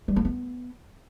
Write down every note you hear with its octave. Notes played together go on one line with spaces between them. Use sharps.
G3
A#3
B3